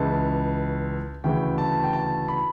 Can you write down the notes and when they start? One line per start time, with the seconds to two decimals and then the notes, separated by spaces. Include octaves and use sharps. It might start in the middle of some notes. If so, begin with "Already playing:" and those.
Already playing: C#2 C#3 E3 A5
1.24 D2 C#3 E3 G5
1.58 A5
1.83 G5
1.93 A5
2.28 B5